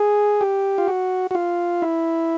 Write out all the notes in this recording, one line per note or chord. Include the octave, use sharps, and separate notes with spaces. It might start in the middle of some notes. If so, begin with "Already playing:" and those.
Already playing: G#4
G4
F4
F#4
F#4
F4
E4